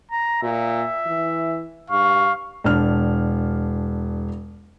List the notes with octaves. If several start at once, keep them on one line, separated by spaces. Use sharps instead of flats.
A#5
A#2 E5
E3
G2 F5 C#6
E1 D4 F6